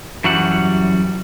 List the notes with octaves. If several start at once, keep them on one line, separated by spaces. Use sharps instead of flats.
F#2 E3 F#3 G3 F#5